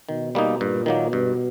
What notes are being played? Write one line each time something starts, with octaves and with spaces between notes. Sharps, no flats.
B2 D#3
G3 A#3 D#4
G2 A#2
D#3 F#3 A#3
G2 B2